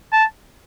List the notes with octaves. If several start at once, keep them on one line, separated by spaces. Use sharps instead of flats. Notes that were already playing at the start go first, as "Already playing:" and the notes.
A5